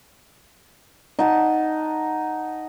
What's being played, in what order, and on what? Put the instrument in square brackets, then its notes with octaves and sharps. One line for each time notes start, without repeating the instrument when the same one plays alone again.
[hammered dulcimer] D#4 F#5 A5